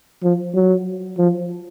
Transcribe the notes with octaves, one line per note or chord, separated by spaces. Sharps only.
F3
F#3
F3